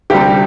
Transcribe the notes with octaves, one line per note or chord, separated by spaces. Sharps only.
D2 C3 G3 G4